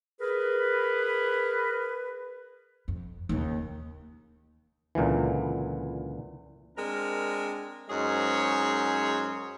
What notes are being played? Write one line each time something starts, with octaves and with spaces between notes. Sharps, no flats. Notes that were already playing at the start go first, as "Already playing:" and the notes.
G#4 A#4 B4
F2
D#2 C#3
C#2 A#2 D3 E3
G#3 C4 D4 A#4
F#2 G#3 D#4 G#4 C5 C#5